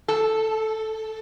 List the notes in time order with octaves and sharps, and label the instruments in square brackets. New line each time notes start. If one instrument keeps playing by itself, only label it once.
[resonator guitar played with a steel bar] A4